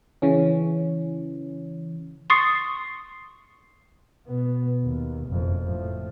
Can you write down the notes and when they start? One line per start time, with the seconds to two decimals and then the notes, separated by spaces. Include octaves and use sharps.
0.22 C#3 E3 C#4
2.30 C6 C#6 D#6 A6 C7 C#7
4.28 B2 B3
4.83 D#2 B2
5.29 F#1 F2
5.64 A2 F3